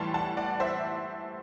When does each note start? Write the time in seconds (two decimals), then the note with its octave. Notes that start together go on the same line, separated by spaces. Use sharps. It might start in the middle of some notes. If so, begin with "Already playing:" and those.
Already playing: A2 E3 G3 A5 C6
0.14 F#5 A5
0.37 D5 F#5
0.60 C5 E5